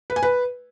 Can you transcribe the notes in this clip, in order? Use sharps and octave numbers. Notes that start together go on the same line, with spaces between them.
B4
G#5
B4